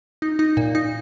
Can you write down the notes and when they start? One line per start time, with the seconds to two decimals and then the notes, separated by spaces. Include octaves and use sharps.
0.22 D#4
0.39 D#4
0.57 A#2
0.75 D#4